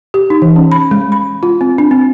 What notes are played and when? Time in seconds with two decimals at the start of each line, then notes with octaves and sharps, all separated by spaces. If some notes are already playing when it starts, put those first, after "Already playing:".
0.14 G4
0.30 D#4
0.42 E3
0.56 C#4
0.72 B5
0.91 G#3
1.12 B5
1.43 F4
1.61 C4
1.78 D4
1.91 C4